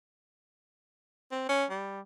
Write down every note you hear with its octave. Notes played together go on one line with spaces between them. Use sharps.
C4
C#4
G3